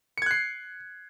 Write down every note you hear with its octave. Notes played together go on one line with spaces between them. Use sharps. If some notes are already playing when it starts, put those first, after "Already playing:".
F#6 G#6 C7 C#7